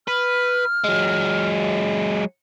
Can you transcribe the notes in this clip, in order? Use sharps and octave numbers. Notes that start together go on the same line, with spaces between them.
B4 F6
F#3 G#3